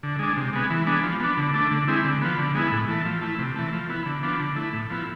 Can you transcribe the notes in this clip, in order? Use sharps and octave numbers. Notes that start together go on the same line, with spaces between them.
D3
G#3 D4
C3
G#3 B3
E3
G#3 B3 D4
F3
B3 D4
D3
A3 D4
D3
G#3 C4 E4
D3
F3 B3
D3
G#3 B3 E4
A2
E3 A3
F3
A3 E4
C3
E3 A3
F3
B3 E4
D3
F3 B3 D4
D3
A3 E4
A2
F3 B3 E4